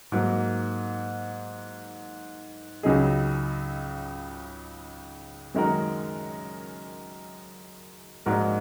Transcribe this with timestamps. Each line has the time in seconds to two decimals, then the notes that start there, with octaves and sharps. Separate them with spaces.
0.12 G#2 F#3 A#3
2.83 C#2 C#3 F#3 D#4 G#4
5.55 F#2 D#3 G#3 F#4 A#4
8.26 A#1 G#2 G#3 F#4 A#4